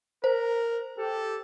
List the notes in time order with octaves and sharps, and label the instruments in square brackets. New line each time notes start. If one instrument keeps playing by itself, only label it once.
[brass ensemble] A#4 [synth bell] C5
[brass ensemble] G4 A4